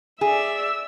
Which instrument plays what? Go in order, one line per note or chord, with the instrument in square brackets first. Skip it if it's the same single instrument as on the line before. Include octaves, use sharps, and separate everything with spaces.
[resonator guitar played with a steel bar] G#4 [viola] D5 E5 [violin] E6